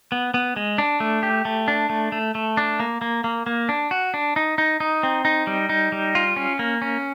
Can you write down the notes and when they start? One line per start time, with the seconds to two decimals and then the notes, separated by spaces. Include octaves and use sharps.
0.12 B3
0.34 B3
0.56 G#3
0.78 D4
1.00 A3
1.23 G4
1.45 A3
1.68 D4
1.90 A3
2.12 A3
2.35 A3
2.57 D4
2.80 A#3
3.02 A#3
3.24 A#3
3.46 A#3
3.69 D4
3.91 F#4
4.14 D4
4.36 D#4
4.58 D#4
4.80 D#4
5.03 C4
5.25 D#4
5.47 G3
5.69 D#4
5.92 G3
6.15 F4
6.36 C#4
6.59 A#3
6.82 C#4